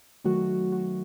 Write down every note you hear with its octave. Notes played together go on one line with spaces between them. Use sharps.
D#3 F#3 A3 F#4
F#4